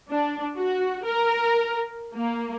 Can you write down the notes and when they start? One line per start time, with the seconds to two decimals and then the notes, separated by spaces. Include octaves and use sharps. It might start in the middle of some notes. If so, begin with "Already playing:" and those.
0.11 D4
0.56 F#4
1.04 A#4
2.14 A#3